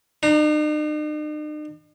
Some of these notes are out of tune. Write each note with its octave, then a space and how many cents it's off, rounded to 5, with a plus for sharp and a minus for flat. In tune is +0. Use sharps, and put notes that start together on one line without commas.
D#4 -45 A#5 +0